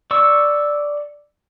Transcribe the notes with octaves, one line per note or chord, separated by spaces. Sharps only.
D5 C#6 E6